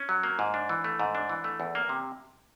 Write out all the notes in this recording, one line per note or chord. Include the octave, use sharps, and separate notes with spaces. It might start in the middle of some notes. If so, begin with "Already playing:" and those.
Already playing: C#4
F#3
A#3
G#2
D4
E3
A3
G#2
D4
E3
A3
E2
A#3
C3